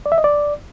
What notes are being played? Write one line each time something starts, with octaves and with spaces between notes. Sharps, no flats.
D5
E5
D#5
D5